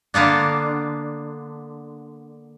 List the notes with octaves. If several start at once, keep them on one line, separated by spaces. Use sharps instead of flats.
D3 A#3 B3 D4